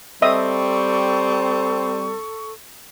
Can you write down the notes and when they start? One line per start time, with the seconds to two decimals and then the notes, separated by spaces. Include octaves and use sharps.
0.22 G3 C4 A4 D#5 E5 C#6 D#6